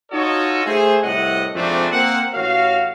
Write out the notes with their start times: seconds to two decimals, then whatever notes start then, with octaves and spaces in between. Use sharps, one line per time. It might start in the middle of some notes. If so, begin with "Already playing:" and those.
0.12 D#4 F4 F#4 A4 C#5 D#5
0.65 A3 G#4 C5
1.03 C2 A2 E4 D#5 F#5
1.55 F2 G#2 C3 A3 C4 D4
1.91 A#3 C4 F#5
2.34 A1 F#4 C#5 F5